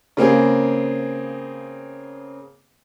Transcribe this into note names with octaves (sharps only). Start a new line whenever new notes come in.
C#3 A#3 C4 G#4